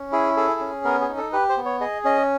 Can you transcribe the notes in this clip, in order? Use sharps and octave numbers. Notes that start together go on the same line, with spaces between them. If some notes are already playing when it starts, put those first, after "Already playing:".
Already playing: C#4
E4 G#4
G#4 A4
C#4
B3 A#4
G#4
D#4
A4
G4 B4
C5
B3
C#5
G#4 D#5
C#4 D#5